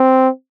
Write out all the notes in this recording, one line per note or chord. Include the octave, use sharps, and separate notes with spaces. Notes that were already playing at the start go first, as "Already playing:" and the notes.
Already playing: C4